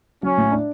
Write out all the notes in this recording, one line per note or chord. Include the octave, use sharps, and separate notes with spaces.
F#3 C#4
A2
D4